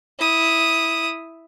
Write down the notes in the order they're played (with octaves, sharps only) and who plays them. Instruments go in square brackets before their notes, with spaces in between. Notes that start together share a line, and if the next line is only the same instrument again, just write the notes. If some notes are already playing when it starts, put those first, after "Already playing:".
[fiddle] E4 D#6